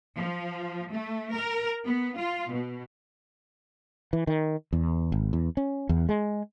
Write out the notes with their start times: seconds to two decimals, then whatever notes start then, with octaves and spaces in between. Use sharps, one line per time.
0.17 F3
0.92 A3
1.33 A#4
1.85 B3
2.16 F4
2.51 B2
4.13 E3
4.27 D#3
4.73 E2
5.12 G#1
5.33 E2
5.57 C#4
5.89 E2
6.09 G#3